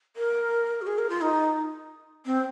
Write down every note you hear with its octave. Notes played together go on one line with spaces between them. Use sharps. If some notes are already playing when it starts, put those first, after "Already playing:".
A#4
F#4
G#4
A#4
F4
D#4
C4